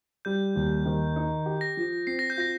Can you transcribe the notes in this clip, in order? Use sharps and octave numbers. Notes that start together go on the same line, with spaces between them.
G3 G6
D#2
D#3
D#4
G4
A#6
F3
C4 C7
A#6
G6
F4 A#6